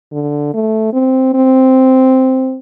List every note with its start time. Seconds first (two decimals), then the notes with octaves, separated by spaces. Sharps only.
0.13 D3
0.54 A3
0.93 C4
1.34 C4